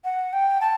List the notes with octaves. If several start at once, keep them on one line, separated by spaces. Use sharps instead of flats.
F#5
G5
A5